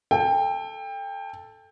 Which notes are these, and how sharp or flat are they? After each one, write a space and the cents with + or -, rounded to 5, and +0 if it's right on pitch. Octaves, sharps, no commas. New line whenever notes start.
A4 +0 G5 +25